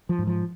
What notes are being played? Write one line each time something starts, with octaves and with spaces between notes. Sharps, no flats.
F3
G#2
F3